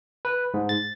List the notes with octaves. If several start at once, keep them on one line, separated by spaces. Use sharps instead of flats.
B4
G#2
A6